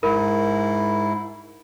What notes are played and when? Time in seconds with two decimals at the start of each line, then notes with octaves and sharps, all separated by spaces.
0.03 G#2 E4 A#4